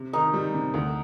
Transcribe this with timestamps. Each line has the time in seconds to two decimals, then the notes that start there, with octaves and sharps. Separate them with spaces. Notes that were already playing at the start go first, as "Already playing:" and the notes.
Already playing: C3
0.13 D#3 D#4
0.33 G3
0.54 C3
0.74 D2